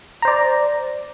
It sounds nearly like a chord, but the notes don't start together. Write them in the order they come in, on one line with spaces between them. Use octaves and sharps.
A#5 C5 D5